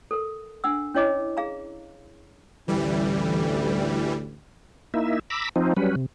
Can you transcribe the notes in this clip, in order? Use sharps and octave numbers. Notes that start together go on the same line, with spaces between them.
A4 A#4
D4 F#5 E6
C#4 E4 C#5 D#5 D6
G#4 F5 A#5
A1 D2 E3 G3
A#3 D#4 E4 E5
A#5 B5 D6 E6
F3 C4 D#4
F#3 G3 C#4 B4
C3